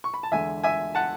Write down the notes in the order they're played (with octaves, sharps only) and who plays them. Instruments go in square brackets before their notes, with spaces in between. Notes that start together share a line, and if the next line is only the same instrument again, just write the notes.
[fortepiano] C#6
B5
A5
E2 D3 G#3 E5 G#5
E5 G#5
F#5 A5